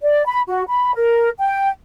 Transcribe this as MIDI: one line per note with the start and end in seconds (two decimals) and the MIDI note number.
0.02 0.24 74
0.26 0.41 83
0.48 0.63 66
0.68 0.92 83
0.95 1.30 70
1.39 1.69 79